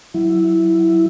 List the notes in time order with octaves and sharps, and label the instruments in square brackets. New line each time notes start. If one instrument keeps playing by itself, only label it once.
[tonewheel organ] F#3 E4